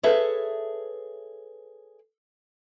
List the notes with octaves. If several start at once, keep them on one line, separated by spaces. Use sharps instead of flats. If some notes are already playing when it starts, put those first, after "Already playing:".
G#4 A4 B4 C#5 E5